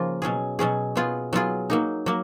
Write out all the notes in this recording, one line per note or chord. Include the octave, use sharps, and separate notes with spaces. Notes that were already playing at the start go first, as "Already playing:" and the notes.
Already playing: C#3 F3 A#3 F4
B2 F#3 C#4 G#4
B2 F#3 C#4 G#4
F#3 B3 F4 G#4
F#3 B3 F4 G#4
F#3 A#3 D#4
F#3 A#3